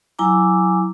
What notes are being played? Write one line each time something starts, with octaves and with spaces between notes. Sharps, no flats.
F#3 E4 G#5 A#5 D6